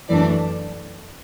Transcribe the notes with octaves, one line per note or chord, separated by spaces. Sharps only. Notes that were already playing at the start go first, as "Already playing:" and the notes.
F#2 E3 A3 D4 D5